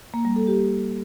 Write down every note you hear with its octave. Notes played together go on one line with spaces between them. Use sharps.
A#3
G3
A4
G4